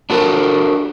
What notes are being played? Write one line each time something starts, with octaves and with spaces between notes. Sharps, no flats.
D4 F#4 A4 A#4